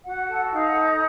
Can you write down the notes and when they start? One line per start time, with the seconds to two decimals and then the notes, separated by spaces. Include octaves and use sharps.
0.04 F#4 F#5
0.28 A4
0.51 D#4 F5
0.68 F#5
0.76 A4
0.84 D#5